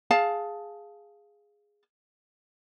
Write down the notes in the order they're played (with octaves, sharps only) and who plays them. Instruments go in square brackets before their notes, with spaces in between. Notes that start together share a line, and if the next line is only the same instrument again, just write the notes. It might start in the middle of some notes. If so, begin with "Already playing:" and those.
[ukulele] G#4 F5 A5